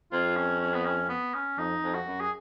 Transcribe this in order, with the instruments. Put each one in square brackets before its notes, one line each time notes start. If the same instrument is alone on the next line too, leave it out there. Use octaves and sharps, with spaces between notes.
[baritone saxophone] F2 [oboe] F4
[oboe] C#4
C#4
B3
C#4
B3
C#4
[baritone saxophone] F2 [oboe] D#4
[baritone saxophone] F2
[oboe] F#4
[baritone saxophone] F#2
[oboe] G#4